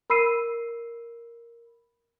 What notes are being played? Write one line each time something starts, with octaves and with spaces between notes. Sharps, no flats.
A#4 B5 E6 C7 D#7